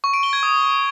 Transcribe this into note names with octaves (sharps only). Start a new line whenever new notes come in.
C#6
D7
G7
G#6
D#6